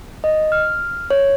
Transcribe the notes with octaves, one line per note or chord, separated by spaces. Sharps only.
D#5
F6
C#5